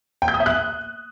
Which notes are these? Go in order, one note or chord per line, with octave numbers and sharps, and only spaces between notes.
G5
G6
D#6
E5
F#6